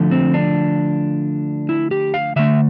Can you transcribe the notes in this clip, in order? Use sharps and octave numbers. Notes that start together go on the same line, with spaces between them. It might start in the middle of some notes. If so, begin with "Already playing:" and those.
Already playing: D3 F3 A3
C4
D4
E4
G4
F5
D3 A3 E5